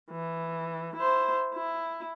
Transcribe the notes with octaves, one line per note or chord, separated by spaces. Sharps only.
E3
E4 C5
E4